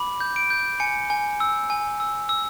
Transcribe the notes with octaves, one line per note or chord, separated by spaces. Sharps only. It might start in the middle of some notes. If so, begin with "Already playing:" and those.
Already playing: B5 D6
G6
D7
G6
G#5 C#7
G#5
E6
G#5
E6
E6